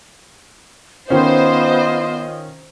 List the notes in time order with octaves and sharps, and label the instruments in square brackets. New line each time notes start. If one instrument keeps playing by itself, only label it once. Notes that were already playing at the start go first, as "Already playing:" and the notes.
[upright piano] D#3 C#4 [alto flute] B3 [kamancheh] F4 D#5 [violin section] C5